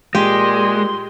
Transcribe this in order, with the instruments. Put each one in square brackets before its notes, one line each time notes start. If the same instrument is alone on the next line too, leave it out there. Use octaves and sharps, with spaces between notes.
[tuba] A#2 [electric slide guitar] G#3 [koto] G4 [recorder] C6